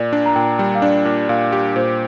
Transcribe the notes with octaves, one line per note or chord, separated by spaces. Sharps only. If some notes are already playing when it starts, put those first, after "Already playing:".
Already playing: A#2 D5
D4
A#5
A#2 G5
G3
F5
D4 D5
A#2
A#2 F5
G4
A#2 C5